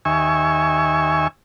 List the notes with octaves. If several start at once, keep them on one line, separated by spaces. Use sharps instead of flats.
D#2 E5 G#5 C#6